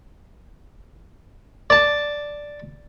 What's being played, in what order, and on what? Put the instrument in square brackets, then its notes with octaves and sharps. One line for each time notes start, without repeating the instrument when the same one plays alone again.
[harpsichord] D5 A5